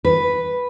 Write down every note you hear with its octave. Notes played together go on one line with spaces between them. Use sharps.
B4